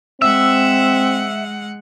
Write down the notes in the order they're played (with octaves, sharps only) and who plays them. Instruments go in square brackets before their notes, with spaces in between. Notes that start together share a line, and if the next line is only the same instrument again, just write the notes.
[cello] G#3 F#5 [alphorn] C4 [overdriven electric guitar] E5 [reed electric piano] E6